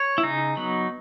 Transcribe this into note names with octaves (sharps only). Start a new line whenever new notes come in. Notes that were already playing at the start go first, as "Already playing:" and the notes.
Already playing: C#5
E4
C#3 D#4
F#3 B3